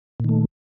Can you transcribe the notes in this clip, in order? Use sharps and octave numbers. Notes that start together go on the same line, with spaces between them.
A#2 D#3 A3